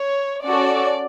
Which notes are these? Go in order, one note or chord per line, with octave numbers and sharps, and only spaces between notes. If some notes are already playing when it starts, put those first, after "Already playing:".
Already playing: C#5
C#4 F#4 A4 D5